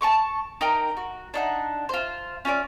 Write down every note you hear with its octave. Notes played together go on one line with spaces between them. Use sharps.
A5 A#5 C#6 D6
D#4 A#4 G5 A#5
F#4
D4 D#4 F#5
F4 C5
C#4 F4 A4 D5